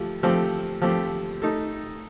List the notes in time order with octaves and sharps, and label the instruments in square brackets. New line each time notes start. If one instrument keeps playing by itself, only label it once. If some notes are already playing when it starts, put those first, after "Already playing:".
Already playing: [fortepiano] F3 A3 G4
F3 A3 C4 G4
F3 A3 C4 G4
A3 D#4 A4